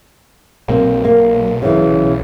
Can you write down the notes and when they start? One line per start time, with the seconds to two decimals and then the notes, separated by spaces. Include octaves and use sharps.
0.68 B1 A#3 C4
1.04 A#3
1.62 C#3 E3